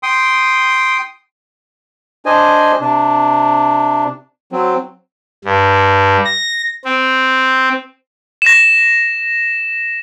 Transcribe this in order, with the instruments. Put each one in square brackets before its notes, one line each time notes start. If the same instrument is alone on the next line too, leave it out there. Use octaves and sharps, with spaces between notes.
[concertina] G5 C6 D#6
[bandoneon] D4 C5 D#5 G#5
C3 D4
F#3 C4
[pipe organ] G2
A#6
C4
[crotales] A#6 E7